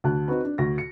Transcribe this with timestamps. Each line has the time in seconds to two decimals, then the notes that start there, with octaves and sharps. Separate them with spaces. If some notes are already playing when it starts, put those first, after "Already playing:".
0.04 D2 D3 A5 F#6
0.28 C4 D#4 F#4 B4
0.45 D4
0.58 D2 C#6 A#6
0.78 C#7